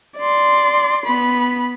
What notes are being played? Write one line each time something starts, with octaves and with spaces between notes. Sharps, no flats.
D5 C6
B3 B5